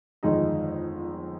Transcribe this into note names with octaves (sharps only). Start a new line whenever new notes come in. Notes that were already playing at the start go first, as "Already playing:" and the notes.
G1 F2 D#3 G#3 D#4